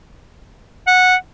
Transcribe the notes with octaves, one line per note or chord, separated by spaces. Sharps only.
F#5